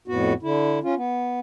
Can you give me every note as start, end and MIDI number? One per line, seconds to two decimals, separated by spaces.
0.08 0.33 41
0.08 0.33 45
0.08 0.33 59
0.08 0.33 66
0.43 0.79 50
0.43 0.79 64
0.83 0.95 61
0.83 0.95 65
0.96 1.40 59